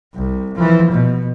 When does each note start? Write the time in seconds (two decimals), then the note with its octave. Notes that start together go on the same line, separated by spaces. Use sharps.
0.14 C2
0.56 E3 F3
0.91 B2